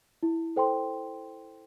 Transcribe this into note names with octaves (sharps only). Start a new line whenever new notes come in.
E4
A4 C5 G5 C6